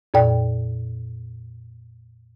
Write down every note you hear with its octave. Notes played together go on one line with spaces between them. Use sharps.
F2 A#2 D5 G5